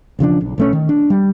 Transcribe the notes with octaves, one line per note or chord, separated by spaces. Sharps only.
E1 C#3 F3 D4
B1
B1 A3 C#4
D#3
D4
G3